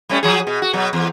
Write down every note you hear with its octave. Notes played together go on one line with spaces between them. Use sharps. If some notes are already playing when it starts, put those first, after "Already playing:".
G3 A3 C#4
F3 F#3 G#4
B2
F#4
B2 F#3
E2